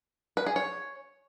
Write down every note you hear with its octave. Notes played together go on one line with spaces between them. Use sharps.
B4
G#4
C#5